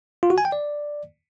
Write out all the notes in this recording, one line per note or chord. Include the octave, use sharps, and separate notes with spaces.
F4
F#4
G#5
G5
D5